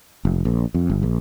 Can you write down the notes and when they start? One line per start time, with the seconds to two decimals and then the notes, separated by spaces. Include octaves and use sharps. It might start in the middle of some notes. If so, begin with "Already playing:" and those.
0.25 F1
0.45 A#1
0.74 F2
0.90 G1
1.03 A#1